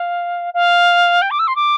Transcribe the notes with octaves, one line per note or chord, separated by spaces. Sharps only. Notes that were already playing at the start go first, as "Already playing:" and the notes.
Already playing: F5
F5
G5
D6
E6
C6
D6